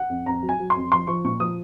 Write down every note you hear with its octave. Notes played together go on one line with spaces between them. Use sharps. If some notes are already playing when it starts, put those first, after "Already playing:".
Already playing: F#5
F2
F2 A#5
F#3
G#5
F#3
C6
F2
F3 C6
F3 C#6
A#2 C#6
F3 D#6